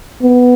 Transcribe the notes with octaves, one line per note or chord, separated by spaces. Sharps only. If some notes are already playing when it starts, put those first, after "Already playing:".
B3